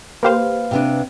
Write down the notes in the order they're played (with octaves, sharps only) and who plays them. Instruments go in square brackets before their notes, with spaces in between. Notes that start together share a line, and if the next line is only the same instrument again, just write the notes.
[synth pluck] A#3 G4 C5 [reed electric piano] B4 F5
[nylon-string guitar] C3 B3 D4